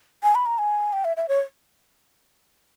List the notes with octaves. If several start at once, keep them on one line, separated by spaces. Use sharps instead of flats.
G#5
B5
A#5
G#5
G5
E5
E5
C#5